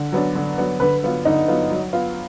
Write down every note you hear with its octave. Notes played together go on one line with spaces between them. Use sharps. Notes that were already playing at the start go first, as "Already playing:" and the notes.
Already playing: D3
F#3 B3 D4
D3
F#3 B3 D4
D3 B4
F#3 B3 F4
D3 D#4
F#3 B3 F4
F#3
B3 F4